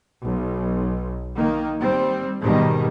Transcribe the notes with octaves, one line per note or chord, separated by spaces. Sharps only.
B1
D#3 A#3
G3 C4
G#2 B2 D#3 G3